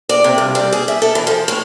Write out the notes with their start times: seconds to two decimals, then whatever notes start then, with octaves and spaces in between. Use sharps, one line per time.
0.09 D5
0.24 C3
0.38 G2
0.55 G3
0.72 G#4
0.88 E5
1.02 A4
1.15 E3
1.27 F3
1.48 A2